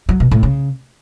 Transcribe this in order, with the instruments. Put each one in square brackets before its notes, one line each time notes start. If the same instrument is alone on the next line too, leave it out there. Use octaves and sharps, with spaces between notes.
[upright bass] F#3
B2
A2
C#3